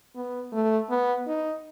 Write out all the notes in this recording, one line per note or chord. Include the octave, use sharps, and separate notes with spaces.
B3
A3
B3
D#4